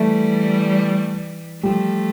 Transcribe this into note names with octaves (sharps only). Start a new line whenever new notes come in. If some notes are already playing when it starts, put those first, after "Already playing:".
Already playing: E3 G3 A3
F3 G3 A3